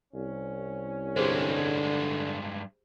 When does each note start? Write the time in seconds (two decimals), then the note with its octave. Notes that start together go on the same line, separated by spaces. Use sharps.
0.14 C2 C#4
1.16 G2 D3 G#3 G4 G#4 C5